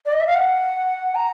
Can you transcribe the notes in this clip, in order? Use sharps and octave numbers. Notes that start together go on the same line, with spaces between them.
D5
D#5
E5
F5
F#5
A#5